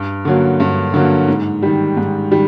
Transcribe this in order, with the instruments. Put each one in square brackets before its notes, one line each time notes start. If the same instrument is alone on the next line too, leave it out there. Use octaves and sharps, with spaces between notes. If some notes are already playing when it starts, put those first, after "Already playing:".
Already playing: [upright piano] G2
D3 F#3 A#3
G2
D3 F#3 A#3
G#2
D#3 G3
G#2
D#3 G3